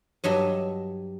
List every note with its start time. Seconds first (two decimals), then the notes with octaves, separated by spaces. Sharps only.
0.24 G2 F#3 D#5 E5